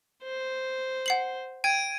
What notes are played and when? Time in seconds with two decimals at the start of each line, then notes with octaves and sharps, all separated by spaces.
0.23 C5
1.06 F#5 C7 F#7
1.64 G5 G#6 D7 D#7